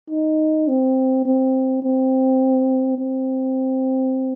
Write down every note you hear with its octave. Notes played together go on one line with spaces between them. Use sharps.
D#4
C4
C4
C4
C4